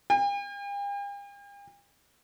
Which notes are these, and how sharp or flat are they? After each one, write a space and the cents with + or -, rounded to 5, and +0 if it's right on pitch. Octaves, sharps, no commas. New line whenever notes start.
G5 +45